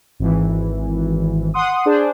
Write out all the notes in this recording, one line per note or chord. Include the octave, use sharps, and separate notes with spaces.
G#1 E3
F#5 C6 D#6
D4 G#4 C5